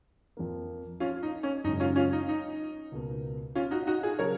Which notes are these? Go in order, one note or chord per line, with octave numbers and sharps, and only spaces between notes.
F2 F3 A#3
C#4 F4
D#4
C#4
F#2 C#3 G#3 D#4
C#4 F4
C#4 F4
D#4
D#4
C#2 B2 A#3
C#4 F4
D#4 F#4
D#4 F#4
F4 G#4
C#3 F#3 C#4 G#4 A#4 C#5